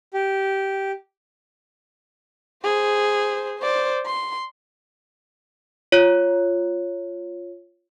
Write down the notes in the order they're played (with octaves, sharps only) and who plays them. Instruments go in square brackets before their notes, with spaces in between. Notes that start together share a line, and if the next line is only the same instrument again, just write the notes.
[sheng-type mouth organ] G4
[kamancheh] G#4 C5
C5 D5
C6
[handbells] F4 C#5